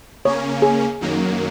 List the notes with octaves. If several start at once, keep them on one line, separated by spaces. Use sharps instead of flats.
C#3 A#3 C#4 C#5
G#4
F#2 D#3 F#3 A#3